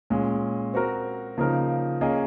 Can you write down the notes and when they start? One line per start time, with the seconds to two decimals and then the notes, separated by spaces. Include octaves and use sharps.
0.10 A#2 G#3 C#4
0.74 C4 F#4 A#4
1.38 C#3 F3 A#3 D#4 A#4
2.01 A#3 C#4 G#4 D#5